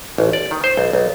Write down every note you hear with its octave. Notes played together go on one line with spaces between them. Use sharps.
A1
D5
D#3
C5
B1
B1